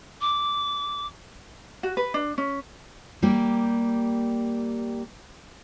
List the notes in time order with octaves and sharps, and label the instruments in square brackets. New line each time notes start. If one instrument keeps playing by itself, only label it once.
[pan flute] D6
[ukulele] F#4
B4
D4
C#4
[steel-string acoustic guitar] G3 A#3 G4